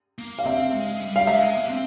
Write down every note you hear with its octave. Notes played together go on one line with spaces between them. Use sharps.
A#3
F5
C4 E5
G#3
G3
F5
G#3 E5
A#3
C4